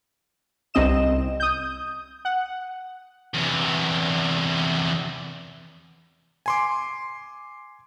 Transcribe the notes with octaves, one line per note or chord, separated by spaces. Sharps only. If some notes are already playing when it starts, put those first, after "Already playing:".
C2 C3 C4 D#5 E7
D#6 G6
F#5
E2 C3
G#5 C6 D6